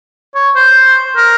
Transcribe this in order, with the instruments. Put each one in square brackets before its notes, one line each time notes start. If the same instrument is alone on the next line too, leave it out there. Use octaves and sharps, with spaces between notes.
[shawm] C#5
C5
A#4